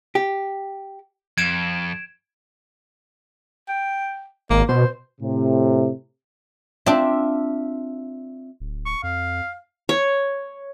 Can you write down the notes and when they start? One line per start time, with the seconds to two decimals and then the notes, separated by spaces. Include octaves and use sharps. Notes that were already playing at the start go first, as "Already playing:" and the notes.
0.15 G4
1.38 F2 G#6 D7 E7
3.68 G5
4.50 G#1 A#3
4.69 B2 C5
5.21 A2 C3
6.86 C4 D4 F4 E5
8.60 D1
8.86 C#6
9.03 F2 F5
9.89 C#5